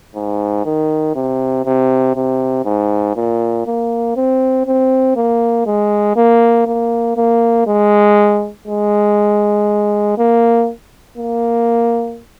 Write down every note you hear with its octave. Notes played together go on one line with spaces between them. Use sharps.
G#2
D#3
C3
C3
C3
G#2
A#2
A#3
C4
C4
A#3
G#3
A#3
A#3
A#3
G#3
G#3
A#3
A#3